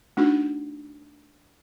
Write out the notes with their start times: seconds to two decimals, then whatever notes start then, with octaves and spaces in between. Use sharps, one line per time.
0.17 A3 D4 D#4 F#4